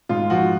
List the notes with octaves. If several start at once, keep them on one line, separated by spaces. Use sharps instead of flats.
G#2 F4
F3 F#4